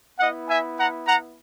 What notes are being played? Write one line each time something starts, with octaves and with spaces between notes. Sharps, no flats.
B3 E4 D#5 F#5
E5 G#5
F#5 A#5
F#5 A#5